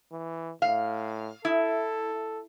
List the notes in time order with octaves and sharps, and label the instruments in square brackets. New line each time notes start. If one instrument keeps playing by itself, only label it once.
[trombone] E3
[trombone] A2 [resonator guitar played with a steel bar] F5
[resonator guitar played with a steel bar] E4 [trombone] A4